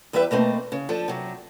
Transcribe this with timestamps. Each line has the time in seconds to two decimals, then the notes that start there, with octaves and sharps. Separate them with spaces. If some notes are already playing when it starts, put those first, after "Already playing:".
0.13 E2 G3 G4 B4 E5
0.31 B2 A3 A#3 C4
0.72 C#3
0.89 F3 D4 A4
1.08 C3 F#3